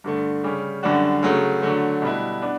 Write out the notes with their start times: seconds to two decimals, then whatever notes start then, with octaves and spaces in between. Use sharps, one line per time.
0.04 G2 D3 A3
0.44 C#3 G3 C#4 G4
0.83 F#2 D3 G3 D4 F#4
1.23 C#3 F#3 A3
1.62 D3 F#3 A3
2.02 B2 G3 B3 E4
2.42 B3 D4